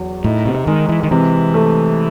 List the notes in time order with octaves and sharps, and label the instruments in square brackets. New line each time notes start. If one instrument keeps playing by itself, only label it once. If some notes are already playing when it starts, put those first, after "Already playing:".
Already playing: [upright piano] E2 F#3
[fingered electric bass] A2 [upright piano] D#4
[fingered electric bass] C3
[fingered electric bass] D#3 [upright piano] G#3
[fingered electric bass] E3
D#3
[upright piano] C3 [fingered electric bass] E3
[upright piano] A3